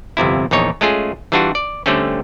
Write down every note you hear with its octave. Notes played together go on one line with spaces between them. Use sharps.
G1 F2 C3 E4
A#1 E2 D#4 C#5
G#3 A3 C#4 F4 G#4
E3 G3 D4 F4 F#4
D5
D3 G3 A3 C4 C#4